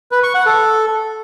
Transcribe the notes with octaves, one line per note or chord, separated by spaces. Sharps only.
B4
C#6
F#5
A4